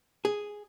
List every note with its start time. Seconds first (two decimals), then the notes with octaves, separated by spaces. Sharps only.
0.25 G#4